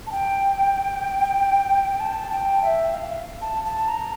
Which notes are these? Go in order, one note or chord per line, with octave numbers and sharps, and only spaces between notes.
A5
G5
A5
G5
E5
F5
A5
A5
A5
A#5